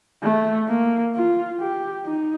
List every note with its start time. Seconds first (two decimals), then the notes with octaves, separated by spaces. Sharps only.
0.24 A3
0.69 A#3
1.15 F4
1.60 G4
2.05 D#4